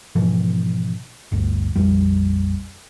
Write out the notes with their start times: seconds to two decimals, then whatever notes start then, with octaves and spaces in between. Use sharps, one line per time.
0.15 G#2 B2 E3 F3
1.32 G1 D2
1.76 A#1 F2 G3